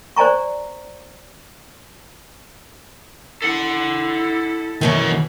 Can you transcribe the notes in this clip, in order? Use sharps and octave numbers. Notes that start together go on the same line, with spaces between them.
C5 D5 G#5 A#5 C#6
E4 A4 F#5
F#2 B2 D#3 E3 C#5